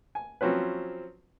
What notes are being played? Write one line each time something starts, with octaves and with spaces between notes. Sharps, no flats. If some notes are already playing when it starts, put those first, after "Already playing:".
G#5
F3 F#3 C4 C#4 B4